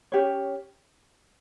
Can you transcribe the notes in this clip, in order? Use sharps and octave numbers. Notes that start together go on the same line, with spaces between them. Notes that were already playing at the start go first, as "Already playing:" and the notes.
C#4 G4 C#5